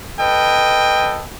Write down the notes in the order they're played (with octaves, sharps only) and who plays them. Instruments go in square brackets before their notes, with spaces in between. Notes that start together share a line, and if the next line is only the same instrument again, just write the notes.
[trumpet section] A4 B4 D#5 G5